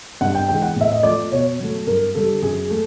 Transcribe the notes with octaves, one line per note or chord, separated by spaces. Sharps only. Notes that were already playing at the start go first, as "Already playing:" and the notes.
G2 F#5
G5
E3 G#3 G5
F#5
A2 E5
D#5
F3 A3 D5
B2 C#5
F#3 A3
G2 A#4
D3 G3 A4
F#2 G#4
A3 A4